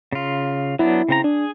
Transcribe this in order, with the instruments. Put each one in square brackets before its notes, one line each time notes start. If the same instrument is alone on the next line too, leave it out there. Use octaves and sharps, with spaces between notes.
[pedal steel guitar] C#3 F4
[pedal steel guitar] F#3 B3 D4 [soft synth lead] E4
[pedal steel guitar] C#3 C4 A#5
[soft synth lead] D4 [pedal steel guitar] G#4